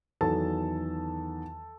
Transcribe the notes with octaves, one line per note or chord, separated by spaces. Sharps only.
E2 D#3 F#3 A4 A5